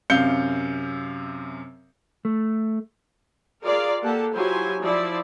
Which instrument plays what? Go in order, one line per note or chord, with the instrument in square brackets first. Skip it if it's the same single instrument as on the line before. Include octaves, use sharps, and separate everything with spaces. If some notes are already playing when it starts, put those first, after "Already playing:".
[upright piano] F#2 C3 F5 G6 C#7 G7
[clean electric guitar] A3
[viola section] F4 G#4 A#4 D5 F5
A#3 G4 A4 F#5 A5
F#3 E4 F4 G4 C5 G#5
F3 E4 D5